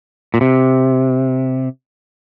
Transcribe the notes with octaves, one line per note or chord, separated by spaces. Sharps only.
A#2
C3